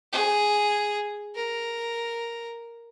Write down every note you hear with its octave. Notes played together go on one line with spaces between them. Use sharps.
G#4
A#4